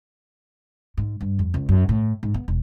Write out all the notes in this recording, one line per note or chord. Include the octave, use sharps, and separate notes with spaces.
G#2
G2
F2
C#2
F#2
A2
G#2
B3
E1